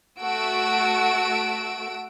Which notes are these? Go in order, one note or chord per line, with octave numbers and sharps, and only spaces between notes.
A3 F#4 E6 D7